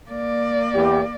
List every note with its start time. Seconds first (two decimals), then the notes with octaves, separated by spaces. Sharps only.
0.11 A#3 D5
0.73 E2 G4